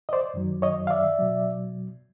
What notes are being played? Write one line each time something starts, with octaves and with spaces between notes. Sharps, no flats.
D#5
C5 D5
F#2 D#3 F#3
C#5 D#5
F5
D5 E5
B2 F#3